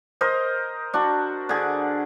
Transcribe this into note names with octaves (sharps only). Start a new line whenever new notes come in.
A#4 C5 D#5
D4 F#4
D3 G#4